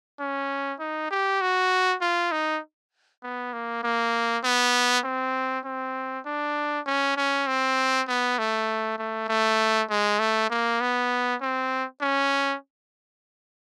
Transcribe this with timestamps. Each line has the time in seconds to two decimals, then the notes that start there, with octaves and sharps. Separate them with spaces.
0.20 C#4
0.79 D#4
1.11 G4
1.41 F#4
2.01 F4
2.32 D#4
3.23 B3
3.53 A#3
3.84 A#3
4.44 B3
5.04 C4
5.65 C4
6.26 D4
6.87 C#4
7.17 C#4
7.47 C4
8.08 B3
8.38 A3
8.98 A3
9.28 A3
9.89 G#3
10.19 A3
10.50 A#3
10.81 B3
11.41 C4
12.01 C#4